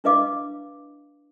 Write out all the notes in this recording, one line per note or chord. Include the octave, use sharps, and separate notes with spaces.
D4 E4 B4 D#5 F5 D6